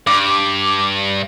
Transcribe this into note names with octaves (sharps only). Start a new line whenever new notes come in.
G2 D6